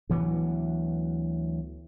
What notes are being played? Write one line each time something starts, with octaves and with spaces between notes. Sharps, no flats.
D2 E3 F#3 B3